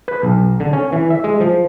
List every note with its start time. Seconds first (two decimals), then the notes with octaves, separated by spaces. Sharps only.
0.08 B4
0.23 B1
0.60 D3
0.73 C#4
0.92 E3
1.10 E5
1.24 G#3
1.40 F3